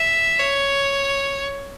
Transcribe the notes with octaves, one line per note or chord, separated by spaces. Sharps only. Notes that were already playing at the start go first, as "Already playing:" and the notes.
Already playing: E5
C#5